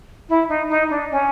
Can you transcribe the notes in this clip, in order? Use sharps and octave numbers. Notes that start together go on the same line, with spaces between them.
E4
D#4
D#4
D4
C#4